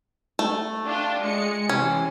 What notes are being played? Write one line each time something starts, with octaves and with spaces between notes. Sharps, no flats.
A3
D4 F4 G4
G#3 C#7
C3 E3 C#4